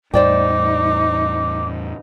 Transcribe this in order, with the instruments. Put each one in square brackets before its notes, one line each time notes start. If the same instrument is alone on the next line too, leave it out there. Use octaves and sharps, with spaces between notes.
[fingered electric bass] E2 A2 G3 [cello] D#4 [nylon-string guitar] C5 D5 G5 [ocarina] D6